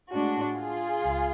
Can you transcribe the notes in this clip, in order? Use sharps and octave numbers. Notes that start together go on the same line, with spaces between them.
A2 G#3 D4 F#4
F4 G#4
C#2